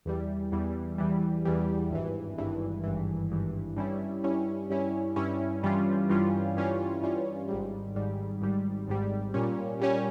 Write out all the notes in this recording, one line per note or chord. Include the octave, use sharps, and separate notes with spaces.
E2 E3 G3
E2 E3 G3
E2 E3 G3
E2 E3 G3
G#1 G2 E3
G#1 G2 E3
G#1 G2 E3
G#1 G2 E3
G2 G3 C#4 E4
G2 G3 C#4 E4
G2 G3 C#4 E4
G2 G3 C#4 E4
G2 E3 G3 C#4 F4
G2 E3 G3 C#4 F4
G2 E3 G3 C#4 F4
G2 E3 G3 C#4 F4
G#1 G#2 G3
G#1 G#2 G3
G#1 G#2 G3
G#1 G#2 G3
A#2 G3 C#4
A#2 G3 C#4